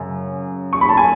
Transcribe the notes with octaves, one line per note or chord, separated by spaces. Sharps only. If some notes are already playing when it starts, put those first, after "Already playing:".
Already playing: F#2 C#3
C#6
B5
A5
G#5